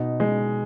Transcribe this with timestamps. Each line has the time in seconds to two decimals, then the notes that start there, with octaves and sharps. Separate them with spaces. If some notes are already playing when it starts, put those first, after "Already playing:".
Already playing: B2 D#4
0.20 G#3